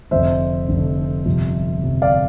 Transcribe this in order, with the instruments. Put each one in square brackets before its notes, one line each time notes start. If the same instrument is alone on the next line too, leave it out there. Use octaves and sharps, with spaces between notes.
[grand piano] F1 F2 D3 C5 E5
F1 F2 D3
G1 F2 C3 F3
G1 F2 C3 F3
D5 F5